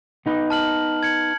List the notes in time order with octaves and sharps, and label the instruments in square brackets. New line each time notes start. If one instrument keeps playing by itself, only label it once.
[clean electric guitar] B3 D#4 B4
[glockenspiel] A5 F6 F#7
G#6 C#7 F#7